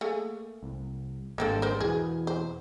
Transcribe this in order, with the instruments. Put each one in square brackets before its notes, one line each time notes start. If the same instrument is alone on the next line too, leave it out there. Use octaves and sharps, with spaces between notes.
[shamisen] A3 A#3 G#4
[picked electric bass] C2
[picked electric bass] G#1 G2 [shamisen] A#3 C4 A4
[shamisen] A#4 C5
[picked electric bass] E2 B2 [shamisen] G#4
[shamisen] C5